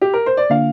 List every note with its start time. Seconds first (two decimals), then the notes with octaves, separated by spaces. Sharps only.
0.01 G4
0.13 A#4
0.26 C5
0.37 D5
0.50 D3 A#3 D4 F4 F5